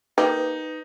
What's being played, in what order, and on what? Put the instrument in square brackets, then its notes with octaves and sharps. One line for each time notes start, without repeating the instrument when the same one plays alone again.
[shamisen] A#3 G4 [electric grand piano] D#4 [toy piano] B4